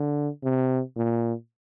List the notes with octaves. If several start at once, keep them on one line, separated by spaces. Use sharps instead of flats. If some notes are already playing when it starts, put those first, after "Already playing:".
Already playing: D3
C3
A#2